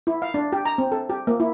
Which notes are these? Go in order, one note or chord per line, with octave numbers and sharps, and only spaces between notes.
E4
F5
D4
G4
A#5
C4
A4
G4
A#3
E4